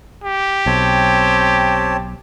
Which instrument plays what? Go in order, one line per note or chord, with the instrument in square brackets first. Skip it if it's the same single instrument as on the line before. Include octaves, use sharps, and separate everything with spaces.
[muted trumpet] G4
[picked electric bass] B1 [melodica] C4 C#5 A5